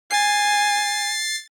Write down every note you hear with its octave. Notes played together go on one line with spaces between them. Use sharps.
G#5 A6 C7